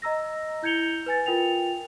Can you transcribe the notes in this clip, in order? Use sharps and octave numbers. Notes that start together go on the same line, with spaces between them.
D#5 A#5 E6 A#6
E4 G6 G#6 C#7 F7 G7
B4 G#5 A6
F4 A#4 G5 F7